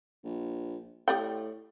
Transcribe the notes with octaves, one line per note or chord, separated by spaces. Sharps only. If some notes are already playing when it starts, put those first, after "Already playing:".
A#1
A2 G4 D5 G5